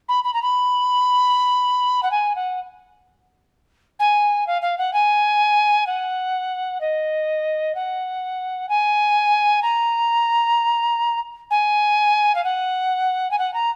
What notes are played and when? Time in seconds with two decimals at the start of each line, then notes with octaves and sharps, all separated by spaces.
0.09 B5
0.24 B5
0.34 A#5
0.42 B5
2.03 F#5
2.11 G#5
2.35 F#5
3.99 G#5
4.47 F5
4.62 F5
4.78 F#5
4.93 G#5
5.87 F#5
6.81 D#5
7.75 F#5
8.69 G#5
9.62 A#5
11.50 G#5
12.35 F5
12.44 F#5
13.31 G#5
13.38 F#5
13.54 A#5